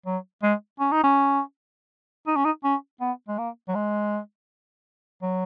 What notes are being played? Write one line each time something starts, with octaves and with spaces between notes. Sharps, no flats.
F#3
G#3
C#4
D#4
C#4
D#4
C#4
D#4
C#4
B3
G#3
A#3
F#3
G#3
F#3